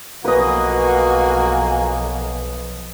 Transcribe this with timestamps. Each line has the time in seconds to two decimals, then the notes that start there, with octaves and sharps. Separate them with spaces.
0.25 B1 F3 A#3 F#4 B4 D#5 G#5